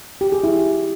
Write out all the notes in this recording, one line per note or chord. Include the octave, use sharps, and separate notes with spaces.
G4
G#4
E4